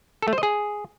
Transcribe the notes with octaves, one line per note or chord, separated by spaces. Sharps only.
A4
A3
C5
D#5
G#4